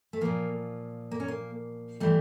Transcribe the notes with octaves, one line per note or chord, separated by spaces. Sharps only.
A3
A#2 F3 A#3
A#3
C#4
A#3
E3 G3 A3